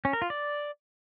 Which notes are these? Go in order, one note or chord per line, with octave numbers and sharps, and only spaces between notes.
C#4
A#4
F4
D5